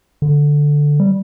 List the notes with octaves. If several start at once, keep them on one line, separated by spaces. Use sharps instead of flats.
D3
G3